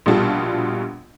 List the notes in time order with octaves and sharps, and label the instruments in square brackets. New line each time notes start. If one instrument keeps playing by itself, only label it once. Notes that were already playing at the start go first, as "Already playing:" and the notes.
[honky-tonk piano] A#1 B2 G3 F4 A5